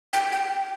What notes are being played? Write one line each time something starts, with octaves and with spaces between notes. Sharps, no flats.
G5
G5